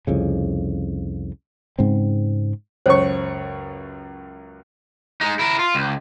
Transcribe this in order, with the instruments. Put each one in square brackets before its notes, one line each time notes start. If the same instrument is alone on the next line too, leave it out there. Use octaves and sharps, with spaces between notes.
[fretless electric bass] C2 F2 C#3
G#2 C#3 C4
[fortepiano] C#2 F#2 C#6 [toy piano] C5 C#5
[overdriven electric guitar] G#3 D#4
E4 A#4
F4
C#2